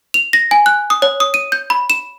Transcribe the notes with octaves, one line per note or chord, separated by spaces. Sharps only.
F7
A#6
G#5
F#6
D#6
C#5
D#6
D#7
G6
B5
E7